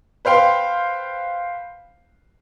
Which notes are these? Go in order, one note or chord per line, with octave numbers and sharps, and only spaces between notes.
B4 C5 F5 G5 C6